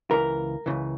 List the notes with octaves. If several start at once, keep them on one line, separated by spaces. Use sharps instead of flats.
C#2 C#3 E3 A#4
C#2 C#3 E3